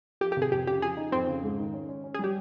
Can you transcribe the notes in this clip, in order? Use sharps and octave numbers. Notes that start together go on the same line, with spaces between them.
F3 G4
G4
C3
G#4
F2 G4
C#3 G4
F3 G#4
D#4
F2 C4
C#3
G#2
D#3
C#4
C#4
C#4
G#4
G3 G4